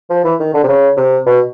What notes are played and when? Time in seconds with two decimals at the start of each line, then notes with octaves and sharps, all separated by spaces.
0.10 F3
0.24 E3
0.39 D#3
0.54 D3
0.63 C3
0.68 C#3
0.97 C3
1.26 B2